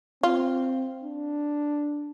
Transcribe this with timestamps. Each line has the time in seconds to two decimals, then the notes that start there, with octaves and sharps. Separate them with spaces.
0.23 C4 F4
1.03 D4